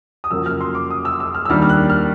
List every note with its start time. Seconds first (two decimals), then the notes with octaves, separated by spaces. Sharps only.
0.24 D#6
0.31 F2 C#3 F#3 A#3 E6
0.46 F6
0.61 C6
0.75 D6
0.90 D#6
1.05 E6
1.20 E6
1.35 F6
1.45 E6
1.49 D#2 D#3 G3 A#3 D4 F6
1.62 F6
1.69 F#6
1.90 F6